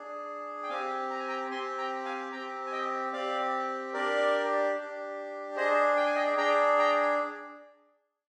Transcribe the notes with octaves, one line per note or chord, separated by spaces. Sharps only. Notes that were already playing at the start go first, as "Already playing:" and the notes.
Already playing: D4 G#4
G5
C4 G4 F5 G#5
A#5
G#5
G5 A#5
C4 G4 G#5 C6
G5 A#5
F5 G#5
C4 G4 G5 A#5
G#5
D#5 G5
C4 G4 D5 F5
D4 G4 A#4 D5
D4 G4
D4 G#4 C5 D#5
G5
G#5
D#5 G5
D4 G#4 G5 A#5
G5 A#5